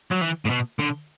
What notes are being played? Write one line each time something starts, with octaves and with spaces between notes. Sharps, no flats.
F#3
E3
A2
B2
D3